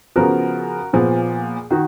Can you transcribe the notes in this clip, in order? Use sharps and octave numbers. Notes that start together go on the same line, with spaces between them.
C#3 F3 B3 F#4 A#4
A#2 F3 B3 G#4
D#3 F#4